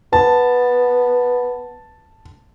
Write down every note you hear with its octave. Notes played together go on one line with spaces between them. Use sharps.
B3 A5